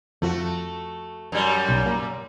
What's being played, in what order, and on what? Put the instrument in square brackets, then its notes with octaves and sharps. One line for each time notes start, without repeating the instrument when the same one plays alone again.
[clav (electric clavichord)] F2 F3 [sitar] A3 F#4
[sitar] F#2 G3
[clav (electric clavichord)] B1
A#3 A#4